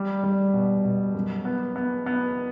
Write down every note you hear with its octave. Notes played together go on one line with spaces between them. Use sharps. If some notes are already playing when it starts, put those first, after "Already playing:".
Already playing: G3
G3
B2
B2
F#2
B3
B3
B3